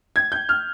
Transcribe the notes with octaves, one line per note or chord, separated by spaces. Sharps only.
G#6
G6
F6